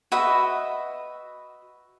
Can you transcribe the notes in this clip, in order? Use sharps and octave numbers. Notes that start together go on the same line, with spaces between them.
F#4 B4 D#5 E5